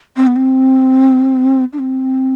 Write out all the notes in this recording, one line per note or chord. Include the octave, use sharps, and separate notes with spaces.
C4
B3
C4
D4
C4